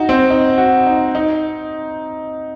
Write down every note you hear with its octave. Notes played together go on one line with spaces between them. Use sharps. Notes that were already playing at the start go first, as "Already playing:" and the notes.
Already playing: D#4 F#4
C4
D#4
F#4
D#4
D#4